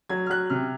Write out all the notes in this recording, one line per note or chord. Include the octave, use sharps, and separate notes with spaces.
F#3 G#6
F6
F#3 F#6
C3 F6